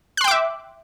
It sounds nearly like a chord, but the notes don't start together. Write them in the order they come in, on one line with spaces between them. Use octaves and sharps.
F#6 C6 G5 D6 E5